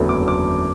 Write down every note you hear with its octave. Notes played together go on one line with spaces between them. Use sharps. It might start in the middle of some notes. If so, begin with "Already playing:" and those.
Already playing: F#1 E2 D3 F#3 A3
D6
D6